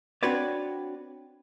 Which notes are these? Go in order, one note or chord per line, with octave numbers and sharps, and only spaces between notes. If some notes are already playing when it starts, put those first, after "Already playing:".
C4 D4 F#4 B4 C#5 D5